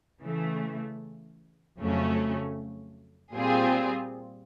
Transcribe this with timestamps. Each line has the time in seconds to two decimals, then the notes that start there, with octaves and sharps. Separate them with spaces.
0.23 C#3 E3 A3
1.78 F2 C#3 F#3 A3 C#4
3.34 A#2 G3 C4 F4 G#4